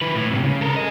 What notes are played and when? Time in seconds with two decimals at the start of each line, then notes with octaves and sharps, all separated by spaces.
0.01 D#3 B4
0.16 A2
0.30 G#2 C3
0.44 C#3
0.61 A4 A#4
0.76 G#4 D#5